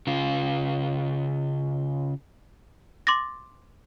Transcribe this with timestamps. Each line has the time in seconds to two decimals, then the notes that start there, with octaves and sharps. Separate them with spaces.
0.07 C#3 F4
3.07 C6 D6 A6 A#6